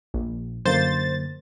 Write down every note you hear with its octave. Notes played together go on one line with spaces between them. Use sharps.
A#1
F#2 D3 A#3 C5 A6